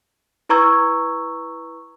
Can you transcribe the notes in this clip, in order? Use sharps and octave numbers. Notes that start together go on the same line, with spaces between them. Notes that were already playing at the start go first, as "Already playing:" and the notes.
E4 B4 A#5 C#6 E6 G#6